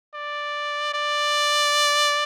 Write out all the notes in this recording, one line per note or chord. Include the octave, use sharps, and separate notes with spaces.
D5
D5